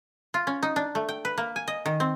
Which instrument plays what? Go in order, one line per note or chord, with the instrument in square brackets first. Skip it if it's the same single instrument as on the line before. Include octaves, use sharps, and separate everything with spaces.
[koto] F4
C#4
D#4
D4
A3
G5
B4
A#3
G#5
D#5
D#3
C4